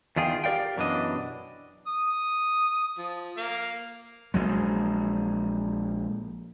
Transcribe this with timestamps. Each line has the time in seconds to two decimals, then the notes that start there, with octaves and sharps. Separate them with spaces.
0.16 E2 D#3 F4 G#4 G5
0.44 G4 A#4 D5 F5 G5
0.77 F#2 B2 E3 G#3 D4 D#5
1.87 D#6
2.98 F3
3.37 A#3 F5
4.34 A#1 F#3 G#3